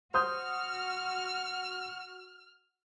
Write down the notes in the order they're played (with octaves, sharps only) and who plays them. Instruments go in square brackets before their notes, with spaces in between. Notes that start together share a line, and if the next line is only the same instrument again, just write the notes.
[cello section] F#4 [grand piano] C5 D#6 G6 [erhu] F6